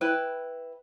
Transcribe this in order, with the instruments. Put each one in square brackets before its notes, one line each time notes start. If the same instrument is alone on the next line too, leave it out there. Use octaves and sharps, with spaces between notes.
[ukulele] E4 B4 G5